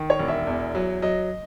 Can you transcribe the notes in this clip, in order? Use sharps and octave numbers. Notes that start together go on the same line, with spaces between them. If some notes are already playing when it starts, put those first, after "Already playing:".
Already playing: D#3
C#5
E1
E5
E2
F#3
F#3 D#5